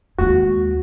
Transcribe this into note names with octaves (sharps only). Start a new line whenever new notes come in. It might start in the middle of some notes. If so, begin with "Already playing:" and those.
D#2 G#3 F#4